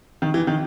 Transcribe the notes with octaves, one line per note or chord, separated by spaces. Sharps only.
D#3
E3
D#3